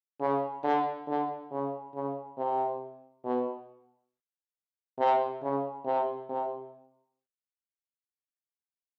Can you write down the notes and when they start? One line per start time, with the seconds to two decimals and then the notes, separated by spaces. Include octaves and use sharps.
0.20 C#3
0.63 D3
1.08 D3
1.51 C#3
1.95 C#3
2.38 C3
3.25 B2
4.99 C3
5.43 C#3
5.86 C3
6.29 C3